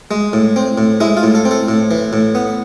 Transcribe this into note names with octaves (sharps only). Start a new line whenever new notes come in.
G#3
A2
C4
A2
G#3 E4
F4
A2
A4
C4
A4
A2
E3
A2
B3